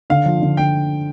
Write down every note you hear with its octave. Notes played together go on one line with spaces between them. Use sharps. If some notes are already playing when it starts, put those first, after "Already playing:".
D3 F5
F3
D3
D3 G5